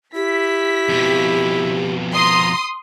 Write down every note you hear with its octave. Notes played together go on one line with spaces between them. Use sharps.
E4 G4 B6
F2 B2
A#5 C6 D#6